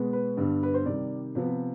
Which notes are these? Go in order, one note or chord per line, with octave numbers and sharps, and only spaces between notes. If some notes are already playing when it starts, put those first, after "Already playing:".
Already playing: B2 G#3 B3
B4
G2 D3 G3 B3
B4
C5
C3 D#3 G3 D5
C3 F3 B3